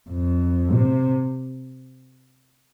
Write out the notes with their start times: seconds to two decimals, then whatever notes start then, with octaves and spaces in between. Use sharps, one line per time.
0.10 F2
0.74 C3